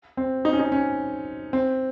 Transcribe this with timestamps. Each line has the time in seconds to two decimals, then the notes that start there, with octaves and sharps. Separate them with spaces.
0.17 C4
0.45 D#4
0.53 C#4
0.59 D#4
0.72 C#4
1.53 C4